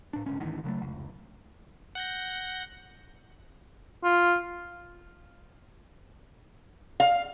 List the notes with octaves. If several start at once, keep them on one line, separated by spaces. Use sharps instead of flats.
A2 D4
D1 G1 C#2 C#4
G#1 D2 D#3 E3
C#3 F#3 G#3 A3
F1 C#2
F#5 G6 A#6
F4
F5